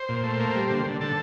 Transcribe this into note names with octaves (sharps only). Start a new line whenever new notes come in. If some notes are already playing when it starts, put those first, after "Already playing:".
Already playing: C5
A#2
A3
A#3
G3
D3
D3
D3 A4